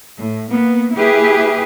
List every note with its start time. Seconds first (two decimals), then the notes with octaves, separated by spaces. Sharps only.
0.18 A2
0.51 A#3 B3
0.96 A#3 E4 G4 G#4 B4